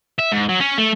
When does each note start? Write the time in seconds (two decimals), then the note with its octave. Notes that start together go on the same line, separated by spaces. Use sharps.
0.19 E5
0.32 G#2
0.49 F#3
0.60 C#4
0.78 A3